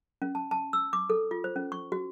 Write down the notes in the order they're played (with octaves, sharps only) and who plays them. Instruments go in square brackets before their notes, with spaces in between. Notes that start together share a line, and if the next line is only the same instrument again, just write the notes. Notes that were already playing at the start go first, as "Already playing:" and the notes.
[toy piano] C#4
A5
A5
E6
D6
A4
F4
C5
C#4
C#6
F#4